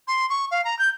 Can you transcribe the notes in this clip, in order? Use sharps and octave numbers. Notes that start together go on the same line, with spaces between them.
C6
C#6
F5
A#5
G6